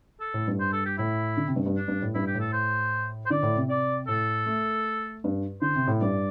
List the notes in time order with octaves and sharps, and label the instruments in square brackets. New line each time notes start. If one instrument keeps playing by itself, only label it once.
[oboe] A4
[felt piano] A2
G2
[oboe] C5
A4
G4
[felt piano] A2 [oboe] E4
[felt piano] D3
C3
G2
G2
[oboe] D4
[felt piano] G2
A2
[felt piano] G2 [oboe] E4
[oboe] G4
[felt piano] A2
[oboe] A4
C5
C5
[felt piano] D3 [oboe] D5
[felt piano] A2
C3
[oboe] D5
[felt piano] A2 [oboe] A4
[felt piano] A3
G2
[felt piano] D3 [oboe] C5
[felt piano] C3
A2
[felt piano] G2 [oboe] D5